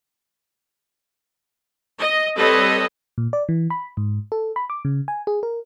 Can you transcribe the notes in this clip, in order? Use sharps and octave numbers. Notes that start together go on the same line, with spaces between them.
D#5
G3 C4 A4 B4 C#5 D#5
A#2
D5
E3
B5
G#2
A4
B5
D6
C#3
G#5
G#4
A#4